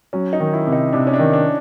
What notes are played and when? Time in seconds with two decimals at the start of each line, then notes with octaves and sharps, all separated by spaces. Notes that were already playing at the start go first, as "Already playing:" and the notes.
0.13 F#3 C#4
0.33 D#4
0.40 D#3
0.53 E4
0.67 C3
0.73 D#4
0.93 C3 D4
1.07 C#4
1.14 D4
1.19 D#3
1.33 D4